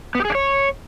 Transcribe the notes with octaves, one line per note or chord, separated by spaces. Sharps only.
B3
G4
G#4
D4
C#5